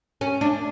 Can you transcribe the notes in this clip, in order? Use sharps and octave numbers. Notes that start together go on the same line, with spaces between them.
C#4
D4